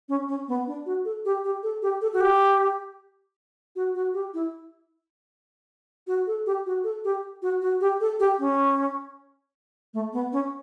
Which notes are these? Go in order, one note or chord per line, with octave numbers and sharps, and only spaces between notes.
C#4
C#4
B3
D4
F#4
A4
G4
G4
A4
G4
A4
F#4
G4
F#4
F#4
G4
E4
F#4
A4
G4
F#4
A4
G4
F#4
F#4
G4
A4
G4
C#4
A3
B3
C#4